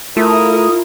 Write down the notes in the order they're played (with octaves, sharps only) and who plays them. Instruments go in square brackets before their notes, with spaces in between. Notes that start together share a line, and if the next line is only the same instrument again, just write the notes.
[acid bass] A3 [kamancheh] E4 A#4 [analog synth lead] F4 [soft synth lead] D#6